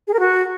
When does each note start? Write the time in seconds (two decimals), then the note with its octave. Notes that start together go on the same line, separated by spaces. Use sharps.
0.08 G#4
0.14 A#4
0.20 F#4